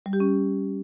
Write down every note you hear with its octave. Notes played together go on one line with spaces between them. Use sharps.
G3
G4
C#4